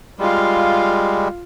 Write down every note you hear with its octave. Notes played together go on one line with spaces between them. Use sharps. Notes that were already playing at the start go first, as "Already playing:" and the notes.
G3 G#3 F4 F5